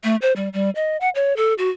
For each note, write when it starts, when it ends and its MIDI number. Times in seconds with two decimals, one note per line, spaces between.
0.04 0.16 57
0.22 0.33 72
0.36 0.49 55
0.53 0.70 55
0.75 0.97 75
1.01 1.09 78
1.15 1.35 73
1.37 1.54 69
1.58 1.69 66